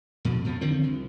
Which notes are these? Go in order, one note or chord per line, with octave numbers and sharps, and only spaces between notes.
F2 B2
F2 F3
D3 D#3 F3 C4
C2